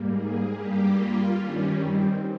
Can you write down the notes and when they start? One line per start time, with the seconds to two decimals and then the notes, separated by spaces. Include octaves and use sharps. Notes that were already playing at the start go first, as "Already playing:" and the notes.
Already playing: G#2 G3 A#3
0.09 G#4
0.51 G2 G3 A#3 G4
0.92 F4
1.34 G2 D#3 G3 C#4
1.76 C4